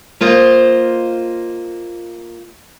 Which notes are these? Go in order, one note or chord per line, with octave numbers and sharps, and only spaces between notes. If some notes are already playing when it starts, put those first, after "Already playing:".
A#3 F4 C5 D#5